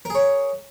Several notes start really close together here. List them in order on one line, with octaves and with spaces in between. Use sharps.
A#4 G#4 C#5